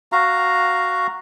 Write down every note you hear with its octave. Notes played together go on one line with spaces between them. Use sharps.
F#4 F5 A#5